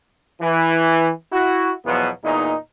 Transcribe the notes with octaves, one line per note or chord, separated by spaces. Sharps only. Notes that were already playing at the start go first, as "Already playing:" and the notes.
E3
E4 F#4
E2 B2 F3 F#3 B3
E2 A#2 D#4